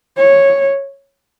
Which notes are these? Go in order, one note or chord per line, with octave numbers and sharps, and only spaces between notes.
C#5